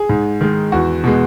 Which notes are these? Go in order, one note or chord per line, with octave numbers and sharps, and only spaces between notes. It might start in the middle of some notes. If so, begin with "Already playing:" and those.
Already playing: G#4
G#2
D#3 G#3
E2 F#4
B2 G#3